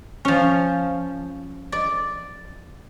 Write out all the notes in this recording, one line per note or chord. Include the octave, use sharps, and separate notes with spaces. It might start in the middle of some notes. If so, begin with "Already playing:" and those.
F3 C#4
D5